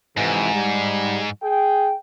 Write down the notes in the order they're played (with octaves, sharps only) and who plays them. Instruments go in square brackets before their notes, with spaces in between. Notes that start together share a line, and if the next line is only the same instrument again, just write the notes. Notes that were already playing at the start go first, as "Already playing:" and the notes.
[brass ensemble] F2 C3 E3 [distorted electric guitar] G#2
[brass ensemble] G3
G#4 G5